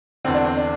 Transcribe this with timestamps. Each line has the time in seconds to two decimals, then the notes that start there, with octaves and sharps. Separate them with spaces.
0.25 E2 D3 C4
0.34 D4
0.45 C4
0.57 D4